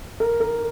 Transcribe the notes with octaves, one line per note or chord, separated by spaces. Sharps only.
A#4
A#4